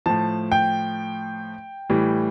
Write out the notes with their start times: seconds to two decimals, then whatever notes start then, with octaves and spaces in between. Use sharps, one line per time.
0.06 A2 F3 A5
0.52 G5
1.90 A2 E3 G3